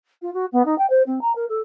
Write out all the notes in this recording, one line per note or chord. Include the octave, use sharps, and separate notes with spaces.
F4
F#4
B3
D#4
G5
C5
C4
A#5
A#4
A4